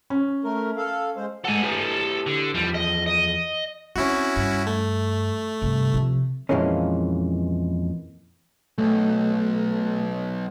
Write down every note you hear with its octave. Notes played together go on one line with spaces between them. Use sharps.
C#4
A3 A#4
A4 F5
G#3 C5
G#3 A4 F#5 G#5
E4 G4 B4
D3
E2 F3 G3
D#5
D#5
C4 C#4 E4 F#4
G2
A3
G2 C3
C3 F3
F2 A#2 E3 G#3 A#3 C#4
B1 A3